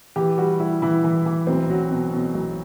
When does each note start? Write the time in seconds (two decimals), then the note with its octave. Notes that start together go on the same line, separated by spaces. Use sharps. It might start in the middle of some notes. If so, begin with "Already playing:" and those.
0.16 E3 G4
0.38 G3 F#4
0.60 G3 E4
0.82 E3 E4
1.04 E3
1.26 E3
1.47 B1 C4
1.70 F#3
1.91 B2
2.13 B2
2.34 B1